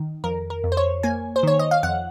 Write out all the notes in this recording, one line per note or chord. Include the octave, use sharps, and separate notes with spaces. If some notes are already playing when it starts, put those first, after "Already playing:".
Already playing: D#3
F2 A#4
A#4
F2
C5
C#5
A#3 G#5
C5
D#3 C#5
D#5
F5
F2 F#5